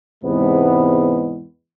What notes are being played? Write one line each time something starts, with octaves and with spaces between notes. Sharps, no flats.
E2 G#2 C3 G#3 B3